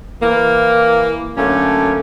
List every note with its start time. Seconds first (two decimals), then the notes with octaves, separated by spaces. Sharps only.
0.21 E3 A#3
1.37 D3 F#3 A3 A#3 C#4